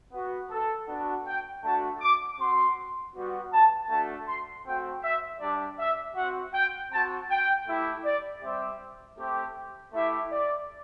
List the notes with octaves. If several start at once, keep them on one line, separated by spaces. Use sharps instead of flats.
B3 F#4
A4
B3 D4 F#4
G5
A3 D4 F#4 A5
D6
C4 F#4 C6
G3 B3 F#4
A5
A3 D4 F#4 A5
C6
A3 C4 F#4 G5
E5
G3 D4 G4 D5
E5
C4 F#4 F#5
G5
C4 F#4 A5
G5
A3 E4 G4
D5
G3 C4 G4 E5
A3 C4 G4
A3 E4 G4 E5
D5